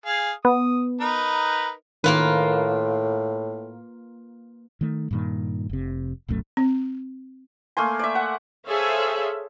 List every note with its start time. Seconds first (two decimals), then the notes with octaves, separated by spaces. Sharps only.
0.06 G#4 F5
0.45 B3 D#6
1.01 D#4 A#4 B4
2.04 A2 D#3 A#3 F4 B4
4.81 D#3 A3
5.11 G2 A#2 D#3
5.70 F1 C3
6.28 D1 B1 F#2 A3
6.57 C4
7.77 A3 A#3 G#5 C6
7.99 D5 E5
8.15 F#5
8.67 G#4 A4 C5 C#5 E5 F5